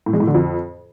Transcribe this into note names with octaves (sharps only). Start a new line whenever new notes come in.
A2
G#3
A2
D3
F2